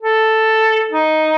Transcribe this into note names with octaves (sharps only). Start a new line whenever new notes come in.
A4
D#4